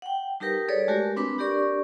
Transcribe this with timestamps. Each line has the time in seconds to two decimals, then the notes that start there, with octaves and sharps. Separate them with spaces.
0.02 F#5 G5
0.40 G3 D#4 G4 A#4 B4
0.68 G#4 A4 B4 C#5 D5
0.88 G#3 A3 F#4 G4 A#4 G#5
1.16 C4 D4 B4 B5 D6
1.38 D4 G4 A#4 D5 C#6